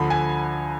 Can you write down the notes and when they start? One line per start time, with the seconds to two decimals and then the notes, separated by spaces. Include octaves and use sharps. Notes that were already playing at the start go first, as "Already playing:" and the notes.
Already playing: D2 D3 F3 B5
0.10 G#5